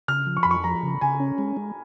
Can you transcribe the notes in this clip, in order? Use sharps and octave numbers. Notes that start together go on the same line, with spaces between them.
C#3 F6
F3
C#6
F2 B5
C#6
F3 A#5
C#3
C#3 G#5
C#4
G#3
G#3